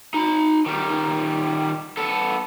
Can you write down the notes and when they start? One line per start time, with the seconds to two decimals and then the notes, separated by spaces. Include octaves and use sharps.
0.14 D#4 B5
0.66 D#3 G3
1.97 B3 A4